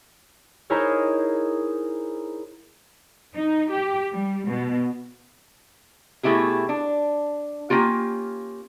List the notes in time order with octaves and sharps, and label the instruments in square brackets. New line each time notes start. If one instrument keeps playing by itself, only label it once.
[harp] D#4 E4 G#4 A#4 C5 C#5
[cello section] D#4
G4
G3
B2
[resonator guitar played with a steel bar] B2 A3 E4 G4 G#4
D4
A#3 C#4 F4 G4